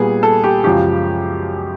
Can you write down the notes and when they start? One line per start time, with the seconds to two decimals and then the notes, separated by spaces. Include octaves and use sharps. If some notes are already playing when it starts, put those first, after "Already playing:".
Already playing: A#2 G3 B3 G#4
0.23 A4
0.44 G4
0.64 F#2 C#3 F3 G#3 G4